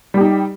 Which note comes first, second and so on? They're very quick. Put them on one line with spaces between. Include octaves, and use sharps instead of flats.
G3 G4 D#4